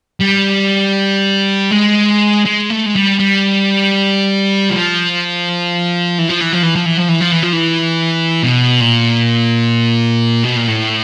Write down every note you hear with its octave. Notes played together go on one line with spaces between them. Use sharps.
G3
G#3
G#3
A3
G#3
G3
G3
F3
E3
F3
E3
F3
E3
F3
E3
F3
E3
F3
E3
F3
E3
B2
A#2
B2
A#2
A2